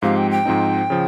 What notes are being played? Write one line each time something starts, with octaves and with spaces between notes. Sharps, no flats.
G#2 F3 G#3 C4 G4 F5
G5
G5
G#2 F3 C4 D#4
C#3 F3